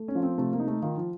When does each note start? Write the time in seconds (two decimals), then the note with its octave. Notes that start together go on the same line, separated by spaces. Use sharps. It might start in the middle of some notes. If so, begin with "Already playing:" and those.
Already playing: A3
0.08 C#4
0.15 F3
0.23 C4
0.38 C3 A3
0.53 A#3
0.60 D#4
0.67 A3
0.82 D#3 F4
0.97 F3